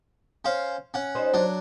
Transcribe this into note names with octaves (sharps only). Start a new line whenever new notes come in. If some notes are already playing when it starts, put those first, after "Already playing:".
C#4 C5 F5
C#4 F#5
G3 D#4 C5
F#3 D4